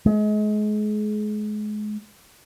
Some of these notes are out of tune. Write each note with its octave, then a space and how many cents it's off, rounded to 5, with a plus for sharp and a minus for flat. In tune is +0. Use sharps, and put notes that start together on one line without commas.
G#3 +30